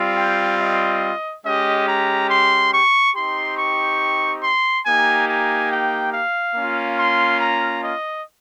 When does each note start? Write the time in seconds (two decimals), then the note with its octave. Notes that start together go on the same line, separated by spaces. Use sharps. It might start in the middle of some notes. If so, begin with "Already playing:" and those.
Already playing: G3 C4 F4
0.17 G5
0.60 D#5
1.45 G#3 C#4 G4 D#5
1.88 A#5
2.31 C6
2.73 C#6
3.15 C4 D#4 G4 C6
3.57 C#6
4.44 C6
4.85 A#3 D#4 G4 G#5
5.29 G#5
5.71 G5
6.14 F5
6.56 A#3 C#4 F4
6.99 C6
7.41 A#5
7.84 D#5